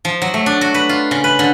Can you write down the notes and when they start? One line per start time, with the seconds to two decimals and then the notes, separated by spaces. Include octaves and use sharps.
0.05 F3
0.22 F#3
0.34 A3
0.46 D4
0.61 F#4
0.74 B4
0.89 F4
1.11 C#3
1.24 B4
1.39 D3